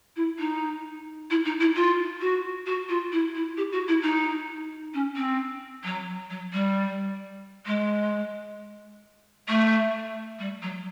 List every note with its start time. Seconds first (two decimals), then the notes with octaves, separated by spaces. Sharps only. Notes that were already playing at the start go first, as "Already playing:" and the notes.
0.16 E4
0.39 D#4
1.30 E4
1.45 D#4
1.60 E4
1.75 F4
2.21 F#4
2.66 F#4
2.88 F4
3.12 E4
3.34 E4
3.57 G4
3.72 F#4
3.88 E4
4.02 D#4
4.94 C#4
5.16 C4
5.84 F#3
6.30 F#3
6.53 G3
7.66 G#3
9.48 A3
10.39 G3
10.62 F#3